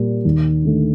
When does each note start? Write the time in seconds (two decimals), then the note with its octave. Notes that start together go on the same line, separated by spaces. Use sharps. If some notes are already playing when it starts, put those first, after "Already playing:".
Already playing: A#2 G3 A#3
0.25 D#2
0.64 D3 A3